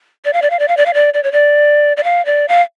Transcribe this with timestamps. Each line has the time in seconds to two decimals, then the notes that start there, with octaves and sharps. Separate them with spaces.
0.25 D5
0.33 F5
0.42 D5
0.50 F5
0.59 D5
0.68 F5
0.77 D5
0.86 F5
0.94 D5
1.14 D5
1.23 C#5
1.32 D5
1.97 D5
2.04 F5
2.26 D5
2.48 F5